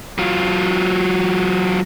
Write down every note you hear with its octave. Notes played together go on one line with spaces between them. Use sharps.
F#3 F4